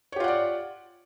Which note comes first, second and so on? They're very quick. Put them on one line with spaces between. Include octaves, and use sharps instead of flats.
C#5 G4 F4 F#5 D5